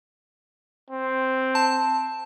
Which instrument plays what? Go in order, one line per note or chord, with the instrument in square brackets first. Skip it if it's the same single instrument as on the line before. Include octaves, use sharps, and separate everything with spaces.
[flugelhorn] C4
[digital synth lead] A5